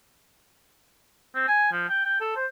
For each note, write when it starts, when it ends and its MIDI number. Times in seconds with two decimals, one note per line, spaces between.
1.35 1.43 60
1.48 1.72 80
1.72 1.87 53
1.89 2.04 79
2.05 2.16 79
2.21 2.34 69
2.36 2.46 72